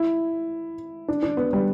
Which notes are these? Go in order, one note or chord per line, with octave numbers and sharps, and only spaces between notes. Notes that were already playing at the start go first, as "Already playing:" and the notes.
Already playing: E4
D4
D4
B3
G3